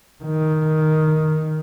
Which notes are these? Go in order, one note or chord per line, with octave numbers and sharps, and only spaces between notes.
D#3